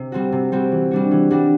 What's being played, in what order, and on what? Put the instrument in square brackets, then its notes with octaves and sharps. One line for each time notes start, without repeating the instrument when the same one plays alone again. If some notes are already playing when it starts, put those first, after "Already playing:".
Already playing: [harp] C3
G3 C4 F#4
C3
G3 C4 F#4
E3
G3 D4 F#4
E3
G3 D4 F#4